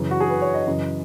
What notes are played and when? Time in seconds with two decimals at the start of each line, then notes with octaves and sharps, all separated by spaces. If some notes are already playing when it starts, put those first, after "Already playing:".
Already playing: F#2 C#3 E3
0.11 F#4
0.20 G#4
0.30 B4
0.42 C#5
0.54 D#5
0.67 F#2 C#3 E3